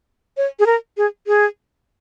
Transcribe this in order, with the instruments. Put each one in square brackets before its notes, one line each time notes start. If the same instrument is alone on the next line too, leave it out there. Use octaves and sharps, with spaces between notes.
[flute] C#5
G#4
A#4
G#4
G#4